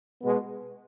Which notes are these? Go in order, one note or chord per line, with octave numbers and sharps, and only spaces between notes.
B2 G#3 B3